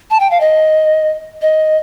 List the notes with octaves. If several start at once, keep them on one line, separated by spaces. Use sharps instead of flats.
A5
G5
F5
D#5
D#5